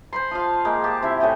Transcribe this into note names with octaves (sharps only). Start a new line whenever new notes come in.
C5 B5 C6
F3 F4 F5
G#3 A#3 G5
G4 A5
C3 E4 E5
A2 F#4 G#4 G5